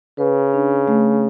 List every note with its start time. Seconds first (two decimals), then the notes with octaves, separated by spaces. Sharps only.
0.18 C#3 B4
0.54 D4
0.88 A3